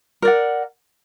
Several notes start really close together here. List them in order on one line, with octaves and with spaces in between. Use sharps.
A#4 D5 F#5